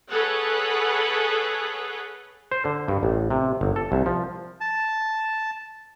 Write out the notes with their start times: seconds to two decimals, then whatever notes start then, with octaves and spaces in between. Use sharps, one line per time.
0.11 G#4 A4 B4 C#5 F#5
2.52 C5
2.65 D3
2.88 G2
3.03 A1
3.30 C3
3.61 G1
3.76 A4
3.92 C2
4.06 F3
4.61 A5